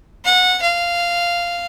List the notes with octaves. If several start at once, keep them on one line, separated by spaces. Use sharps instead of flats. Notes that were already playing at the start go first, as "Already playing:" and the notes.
F#5
F5